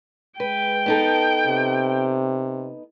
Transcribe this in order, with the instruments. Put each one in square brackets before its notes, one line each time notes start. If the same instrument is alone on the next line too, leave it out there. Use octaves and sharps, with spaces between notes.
[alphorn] G#3 [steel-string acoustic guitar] B4 [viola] G5
[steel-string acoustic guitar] B3 D#4 A4
[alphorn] C3